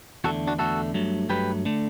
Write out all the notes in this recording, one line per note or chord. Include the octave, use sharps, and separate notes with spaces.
E2 D3 A3 F#4 A4
D4 F#4
E2 D3 A3 F#4 A4
G2 F#3 A3
G2 F#3 A3 G4 B4
D3 A3